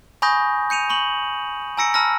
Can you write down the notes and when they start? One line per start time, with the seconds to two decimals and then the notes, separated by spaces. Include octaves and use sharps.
0.22 G#5 B5 C#6 D#6 G6 A#6
0.70 G6 C#7 D#7 F7
0.90 B5 C#6 F#7
1.77 G#5 A#5 E6 A#6 C#7 D7
1.94 A5 B5 E6 F6 A#6